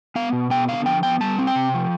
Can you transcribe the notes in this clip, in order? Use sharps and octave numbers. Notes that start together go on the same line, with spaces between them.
B3 F5
B2
B3 G5
D3 F5
F3 G5
B3 G5
G3 A5
C4
G5
C3
F3